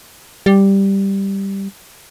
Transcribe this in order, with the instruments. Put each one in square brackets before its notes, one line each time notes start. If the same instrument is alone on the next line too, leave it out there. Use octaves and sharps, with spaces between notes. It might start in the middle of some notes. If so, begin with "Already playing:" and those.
[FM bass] G3